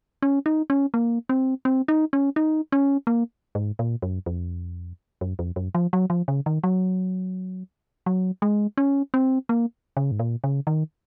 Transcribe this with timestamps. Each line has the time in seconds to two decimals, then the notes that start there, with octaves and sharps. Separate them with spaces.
0.22 C#4
0.46 D#4
0.70 C#4
0.94 A#3
1.29 C4
1.65 C4
1.88 D#4
2.13 C#4
2.36 D#4
2.72 C#4
3.07 A#3
3.55 G#2
3.79 A#2
4.02 F#2
4.26 F2
5.21 F#2
5.39 F2
5.56 F#2
5.75 F3
5.93 F#3
6.10 F3
6.28 C#3
6.46 D#3
6.64 F#3
8.06 F#3
8.42 G#3
8.77 C#4
9.14 C4
9.49 A#3
9.97 C#3
10.11 G#2
10.20 A#2
10.44 C#3
10.67 D#3